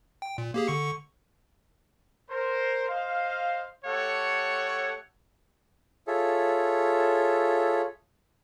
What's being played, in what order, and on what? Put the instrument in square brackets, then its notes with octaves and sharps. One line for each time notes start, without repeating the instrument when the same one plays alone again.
[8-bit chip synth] G5
A#2
A#3 G4 G#4
D3 C#6 C#7
[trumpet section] A#4 C5
C5 D#5 F5
A3 G4 A4 C#5 F#5
[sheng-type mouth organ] F4 G#4 A4 C#5 E5